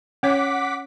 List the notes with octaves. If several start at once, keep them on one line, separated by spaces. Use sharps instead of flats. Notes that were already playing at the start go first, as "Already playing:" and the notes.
C#4 C#5 F#5 D6 B6